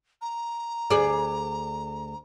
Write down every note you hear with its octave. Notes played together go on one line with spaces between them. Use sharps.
A#5
D2 G#4 D5